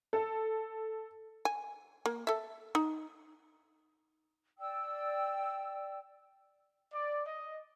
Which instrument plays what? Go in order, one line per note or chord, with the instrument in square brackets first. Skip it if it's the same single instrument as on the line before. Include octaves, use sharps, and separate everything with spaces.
[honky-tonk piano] A4
[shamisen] G#5
A#3
A4 E5
D#4
[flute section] D5 G5 E6
[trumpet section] D5
D#5